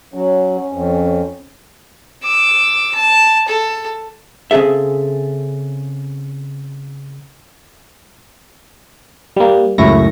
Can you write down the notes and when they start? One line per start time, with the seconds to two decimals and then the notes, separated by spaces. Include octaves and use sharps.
0.14 F#3 C#4
0.72 F2
2.24 D6 E6
2.95 A5
3.48 A4
4.51 C#3 C4 G#4 A4 E5
9.36 G3 A#3
9.78 C#2 F#2 A2 E4 C#6 A#6